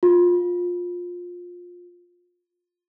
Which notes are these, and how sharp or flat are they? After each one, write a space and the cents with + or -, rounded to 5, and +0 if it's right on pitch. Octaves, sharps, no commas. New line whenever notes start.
F4 +20